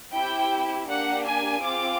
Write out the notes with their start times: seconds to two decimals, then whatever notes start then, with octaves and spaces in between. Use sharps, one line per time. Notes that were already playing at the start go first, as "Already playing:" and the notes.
0.14 C4 E4 G4 G5
0.88 A#3 D4 G4 F#5
1.25 G#5
1.62 C4 F4 G#4 D6